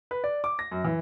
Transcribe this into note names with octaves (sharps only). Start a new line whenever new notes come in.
B4
D5
D6
A#6
F#2
E3